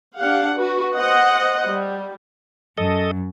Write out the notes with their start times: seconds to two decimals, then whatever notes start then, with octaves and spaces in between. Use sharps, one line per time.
0.18 D4 G4 F5 F#5
0.57 F#4 B4
0.96 C5 D#5 F#5
1.66 G3
2.78 F#2 A4 D#5